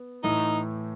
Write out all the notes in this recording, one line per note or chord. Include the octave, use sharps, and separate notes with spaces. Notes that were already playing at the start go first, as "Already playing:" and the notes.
Already playing: B3
A2 E3 A3 D#4